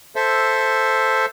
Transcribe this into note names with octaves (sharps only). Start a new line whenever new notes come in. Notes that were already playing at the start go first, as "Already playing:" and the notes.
A4 C5 E5